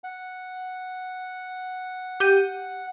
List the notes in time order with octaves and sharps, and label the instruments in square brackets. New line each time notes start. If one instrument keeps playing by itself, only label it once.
[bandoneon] F#5
[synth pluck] G4 G6 D#7